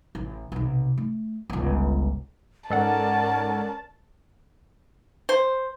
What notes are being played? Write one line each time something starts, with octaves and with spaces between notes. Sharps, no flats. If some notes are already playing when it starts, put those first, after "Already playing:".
A1
B1 C3
A3
G1 C#2
G#2 C#4 A4 A#4 D5 F#5 A5
C5